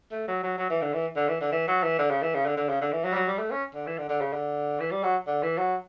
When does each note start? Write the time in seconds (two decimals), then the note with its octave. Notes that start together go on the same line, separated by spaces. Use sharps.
0.11 A3
0.28 F#3
0.43 F#3
0.58 F#3
0.70 E3
0.82 D3
0.94 E3
1.16 D3
1.28 E3
1.41 D3
1.52 E3
1.68 F#3
1.83 E3
1.99 D3
2.10 C#3
2.22 E3
2.34 C#3
2.46 D3
2.57 D3
2.69 C#3
2.81 D3
2.92 E3
3.05 F#3
3.12 G3
3.15 F#3
3.27 G3
3.39 A3
3.51 C#4
3.75 D3
3.87 E3
3.98 D3
4.09 D3
4.21 C#3
4.33 D3
4.80 E3
4.92 G3
5.03 F#3
5.27 D3
5.43 E3
5.58 F#3